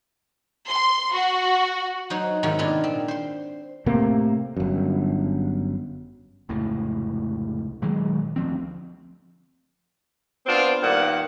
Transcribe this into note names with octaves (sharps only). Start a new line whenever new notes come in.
C6
F#4
F#3 D#4 F#4 C5
G#2 C3 D#3 F4 F#4
A#2 B3 D4 F4 D#5 G#5
C4
C5 C6
A2 C3 A3 A#3
G1 F#2
F1 C#2 A2
A#2 D#3 F#3 G#3
D2 F3 C4
B3 C4 D4 F4
G2 A#2 D#3 F#5